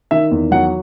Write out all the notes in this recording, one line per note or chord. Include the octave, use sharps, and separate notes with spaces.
D#3 E5
E2
F#3 F#5